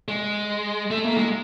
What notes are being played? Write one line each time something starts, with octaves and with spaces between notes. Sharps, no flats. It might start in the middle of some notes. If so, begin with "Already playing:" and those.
G#3
A3
A#3
G#3